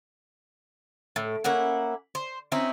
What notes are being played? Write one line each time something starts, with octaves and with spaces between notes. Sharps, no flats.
A2
A#3 C#4 E4 F#5
C5
C4 C#4 D#4 E4